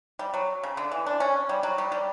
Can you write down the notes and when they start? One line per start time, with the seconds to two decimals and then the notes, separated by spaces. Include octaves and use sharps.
0.19 G3
0.34 F#3
0.63 C#3
0.77 D3
0.91 E3
1.06 D4
1.20 C#4
1.49 G3
1.63 F#3
1.78 G3
1.92 G3